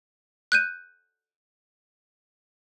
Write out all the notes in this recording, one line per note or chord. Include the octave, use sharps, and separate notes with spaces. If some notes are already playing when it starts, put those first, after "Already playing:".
F#6 G6 D#7